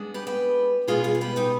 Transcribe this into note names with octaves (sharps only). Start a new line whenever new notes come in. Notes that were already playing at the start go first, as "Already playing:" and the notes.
Already playing: D#2 G#3 B3 D4
G4 B4
G4 B4
B2 G#3 B3 D4 F4 G#4
F4 G#4
G#4
G4 B4
D#4 G4